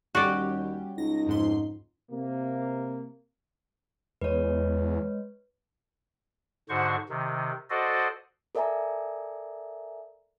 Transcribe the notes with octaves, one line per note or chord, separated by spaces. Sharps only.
D#2 G3 C#4 F#4 G4 D5
C#2 D#4 A#6
F2 G#2 C6
C3 A#3
E2 G#3 B4 C#5
G#2 D3 F#4 C5 C#6
C3 D#3
F#4 A4 C5 D5 D#5
A4 A#4 D5 E5 G#5 A#5